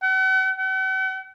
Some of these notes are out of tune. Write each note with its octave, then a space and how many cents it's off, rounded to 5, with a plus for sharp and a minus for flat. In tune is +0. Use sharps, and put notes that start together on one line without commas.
F#5 +40
F#5 +45